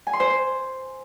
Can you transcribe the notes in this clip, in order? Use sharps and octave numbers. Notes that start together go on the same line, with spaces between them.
G#5
C6
C5